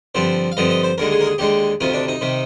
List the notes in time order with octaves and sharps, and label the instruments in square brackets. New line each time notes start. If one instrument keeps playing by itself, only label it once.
[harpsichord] G2 D3 F3 C4
F5
G2 D3 F3 C4 D#5
D#5
C5
D#2 D3 G#3 A#4
G#4
A#4
G#4
D#2 D3 G#3 G4
D2 C3 D#3 F4
D4
D#4
C3 D#3